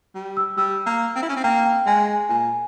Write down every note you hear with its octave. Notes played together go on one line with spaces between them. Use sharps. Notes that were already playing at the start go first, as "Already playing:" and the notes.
G3
E6
G3 E6
A#3
C4
E4
C#4
C4
A#3 G5
G5
G#3 G#5
G#5
A#2 G#5